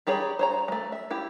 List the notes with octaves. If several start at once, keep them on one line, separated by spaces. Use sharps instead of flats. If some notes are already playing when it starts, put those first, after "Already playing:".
G3 G4 G#4 C#5 A#5
C5 C#5 A#5
G#3 A3
E5
E4 G4